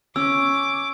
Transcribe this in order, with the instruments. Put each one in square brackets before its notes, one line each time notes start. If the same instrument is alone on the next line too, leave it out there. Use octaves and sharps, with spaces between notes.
[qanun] C#4 [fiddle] D6 [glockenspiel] E6